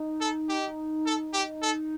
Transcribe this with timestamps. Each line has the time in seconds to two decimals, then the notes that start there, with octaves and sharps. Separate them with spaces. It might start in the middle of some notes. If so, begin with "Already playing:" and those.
Already playing: D#4
0.21 A4
0.49 G4
1.06 A4
1.33 G4
1.62 A4